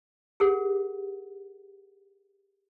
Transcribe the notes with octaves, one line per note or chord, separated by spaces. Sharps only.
G4 G#4 A#4 F#5